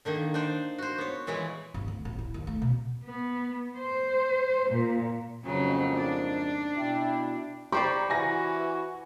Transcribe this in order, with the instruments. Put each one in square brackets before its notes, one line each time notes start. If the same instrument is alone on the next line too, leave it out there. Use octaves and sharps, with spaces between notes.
[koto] D3 D#3 A#3 D#4
D4 D#4 C5 D5
F#4 C5
B3 C#5
A#2 E3 G#3 E4 C#5 D5
[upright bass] G2
D2
A1
E4
D#2
A3
B2
[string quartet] B3
C5
A#2
[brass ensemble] A#1 F2 G#2 [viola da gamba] C#3 F#3
[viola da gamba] D4
[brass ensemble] B2 E4 G5
[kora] G4 C5 D5 [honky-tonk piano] A#5 B5 C#6
[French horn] E3 [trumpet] F#4 [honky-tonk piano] G#5 A#6